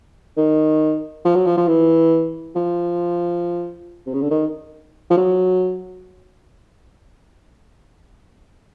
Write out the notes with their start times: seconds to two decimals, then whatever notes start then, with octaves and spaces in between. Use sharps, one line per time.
0.37 D#3
1.25 F3
1.35 F#3
1.46 F3
1.57 F3
1.68 E3
2.55 F3
4.06 C3
4.14 C#3
4.22 D3
4.30 D#3
5.10 F3
5.17 F#3